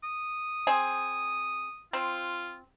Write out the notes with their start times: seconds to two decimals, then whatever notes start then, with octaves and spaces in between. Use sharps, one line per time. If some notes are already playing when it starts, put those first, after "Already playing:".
0.04 D#6
0.67 C4 G#4
1.93 C4 F4